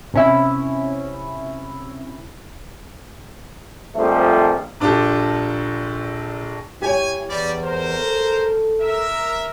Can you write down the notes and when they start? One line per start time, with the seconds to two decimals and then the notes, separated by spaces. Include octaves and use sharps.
0.14 C3 C#4 E4
3.96 A#1 F2 F3 G3 A3
4.80 A#1 D4 F4 G4 A4
6.82 E4 G4 C#5 G#5
7.29 E2 G3 D5
7.63 A#4 C5
7.98 A4
8.80 A#4 E5